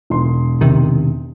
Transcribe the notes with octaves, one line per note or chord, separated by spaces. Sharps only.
E1 C6
C3 D#3